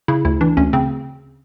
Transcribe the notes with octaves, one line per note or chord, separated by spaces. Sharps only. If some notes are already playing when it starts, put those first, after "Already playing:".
C#3 E4
D2 E4
E3 D4
D2 C#4
C#3 C4